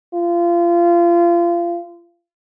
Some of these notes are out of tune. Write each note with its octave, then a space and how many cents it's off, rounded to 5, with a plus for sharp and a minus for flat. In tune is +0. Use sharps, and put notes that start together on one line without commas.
F4 -25